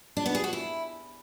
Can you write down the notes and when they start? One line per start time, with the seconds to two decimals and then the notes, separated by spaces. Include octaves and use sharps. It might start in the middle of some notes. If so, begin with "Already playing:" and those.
0.17 D4
0.26 B3
0.35 G#4
0.44 F#4
0.53 E4